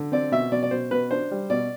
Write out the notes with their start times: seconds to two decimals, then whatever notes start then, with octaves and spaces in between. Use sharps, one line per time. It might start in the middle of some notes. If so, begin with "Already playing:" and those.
Already playing: D3
0.12 C4 D5
0.32 B2 E5
0.52 B2 D5
0.63 D5
0.71 B2 C5
0.91 B2 B4
1.11 D4 C5
1.31 G3
1.50 B2 D5